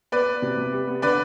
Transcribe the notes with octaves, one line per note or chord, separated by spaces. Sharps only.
B3 B4 D5
B3
C3
C3
G3
B3
D3 B4 D5